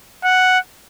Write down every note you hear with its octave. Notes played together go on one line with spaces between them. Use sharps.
F#5